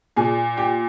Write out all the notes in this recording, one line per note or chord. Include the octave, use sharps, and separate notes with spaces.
A#2 G#4 G#5
G4 G5